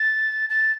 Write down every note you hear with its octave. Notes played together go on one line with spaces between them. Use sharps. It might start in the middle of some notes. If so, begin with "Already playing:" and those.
Already playing: A6
A6